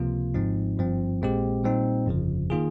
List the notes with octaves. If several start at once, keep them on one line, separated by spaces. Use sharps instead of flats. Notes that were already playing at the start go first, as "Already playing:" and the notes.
Already playing: C#2 C3 F3 A#3 F4
G#1 G#2 F3 C4 D#4
G1 G2 F3 C4
A#1 A#2 G#3 C4 G4
A#2 G3 C4 D#4
G1 F2 C#3 F3
D#3 A#3 F4 G#4